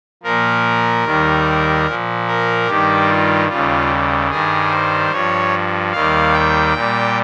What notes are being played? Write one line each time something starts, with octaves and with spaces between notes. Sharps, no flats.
A#2 F3 A#4
D#2 D#3 G3
A#2 F3
A#4
G2 D#3 G3 G4
F4
D#2 C#3 G3 F4
G2 D#3 G3 G#4
C5
G2 F3 C#5
D#2 D#3 G3 F5
G5
A#2 G3